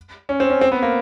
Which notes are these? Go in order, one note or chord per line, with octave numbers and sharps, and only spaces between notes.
C#4
C4
C#4
C4
B3
A#3